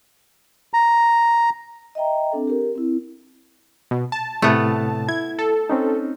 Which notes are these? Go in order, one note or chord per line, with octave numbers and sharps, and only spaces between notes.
A#5
D#5 E5 G5 A#5
C4 D4 A4
G4 A#4
C4 E4
B2
A5
A2 C3 A3 B3
E4 G#6
A4
C4 C#4 D#4